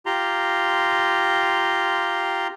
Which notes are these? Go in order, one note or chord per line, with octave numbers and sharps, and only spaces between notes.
F4 G4 A#5 C6